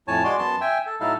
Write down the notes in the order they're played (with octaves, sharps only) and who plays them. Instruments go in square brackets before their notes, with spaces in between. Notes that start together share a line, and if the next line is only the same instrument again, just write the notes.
[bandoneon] F2 A2 C#5 G#5 A5
G#3 F#4 D5 C6
F#2 B3 A5 C6
E5 G5 G#5
A4
A2 F#3 D#4 E4 A4 F5